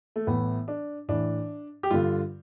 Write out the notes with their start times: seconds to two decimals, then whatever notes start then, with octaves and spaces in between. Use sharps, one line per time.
0.16 A3
0.27 A2 E3 B3
0.68 D4
1.08 A2 E3 D4
1.83 G4
1.90 G2 D3 F4